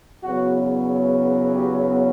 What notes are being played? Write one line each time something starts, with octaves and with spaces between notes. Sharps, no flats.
E2 C#3 F#3 B3 F#4
G4